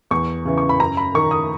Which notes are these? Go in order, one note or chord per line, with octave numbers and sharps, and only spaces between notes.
E2 C#6
C#3 E3
C#6
B5
F#2 A#5
B5
D#3 C#6
D#6